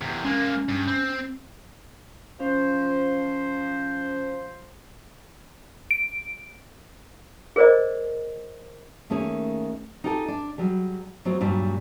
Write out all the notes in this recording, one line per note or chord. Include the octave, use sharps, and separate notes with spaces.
E2 C3
G#3 A#3 C#4
G2
C4
F3 C#4 C5
D7
G#4 A#4 C5 D5 D#5
D#3 A3 A#3 C#4 G#4
D#4 F4 G4 A4 G#5
D4
F#3 G3 G#4
F#3 G#3 C4 F4
G2 A#2 F#3 G3 D4